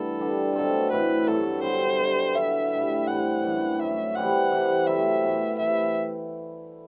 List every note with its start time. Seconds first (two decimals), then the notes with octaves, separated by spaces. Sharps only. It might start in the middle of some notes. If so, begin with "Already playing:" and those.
Already playing: G2 E3 A3 B3 A4
0.19 D3 G3 D4
0.55 B2 F#3 A3 C4 A4
0.91 A2 E3 A3 E4 B4
1.27 G2 F#3 A3 A4
1.62 D3 G3 B3 C5
1.99 B2 G3 B3 F#4
2.35 D3 F#3 B3 E4 E5
2.71 A2 G3 D4
3.07 A2 E3 G3 C4 F#5
3.43 F#2 E3 A3 D4
3.79 A2 F#3 A3 E5
4.15 E3 G3 C4 E4 F#5
4.51 C3 E3 G3
4.87 C3 F#3 A3 E4 E5
5.23 A2 E3 B3
5.59 C3 E3 A3 E5